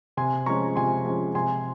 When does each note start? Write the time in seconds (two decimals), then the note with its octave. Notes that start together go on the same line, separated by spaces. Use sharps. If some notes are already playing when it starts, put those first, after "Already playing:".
0.17 C3 G#5 C6
0.46 F3 G#3 C#4 A#5 C#6
0.76 C3 G#5 C6
1.05 F3 G#3 C#4
1.35 C3 G#5 C6